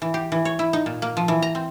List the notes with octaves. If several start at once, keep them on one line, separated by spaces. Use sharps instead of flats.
E3
G4
E3
C#5
E4
D#4
A#2
A#3
F3
E3
A#5
C4